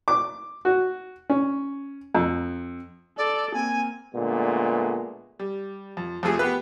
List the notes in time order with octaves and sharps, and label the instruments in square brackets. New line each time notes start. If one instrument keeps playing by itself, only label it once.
[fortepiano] D6
F#4
C#4
F2
[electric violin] A4 [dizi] D5
[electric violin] A#3 C4 [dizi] G#5
[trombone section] A#2 D3 G#3 A3 B3
[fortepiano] G3
F2
F2 C3 A3 G#4 G#5
B3 G4 B4